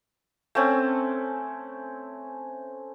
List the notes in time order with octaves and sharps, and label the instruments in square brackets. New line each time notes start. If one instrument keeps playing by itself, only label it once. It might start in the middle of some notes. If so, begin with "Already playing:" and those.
[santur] A3 C4 C#4